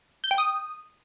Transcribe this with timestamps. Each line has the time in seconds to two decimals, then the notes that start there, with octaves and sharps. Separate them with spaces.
0.24 G6
0.31 G5
0.38 D#6